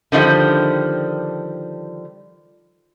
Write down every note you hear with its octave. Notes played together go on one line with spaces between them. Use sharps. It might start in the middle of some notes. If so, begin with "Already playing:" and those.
D3 D#3 F3 G3